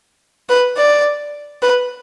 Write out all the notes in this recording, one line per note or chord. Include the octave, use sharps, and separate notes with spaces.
B4
D5
B4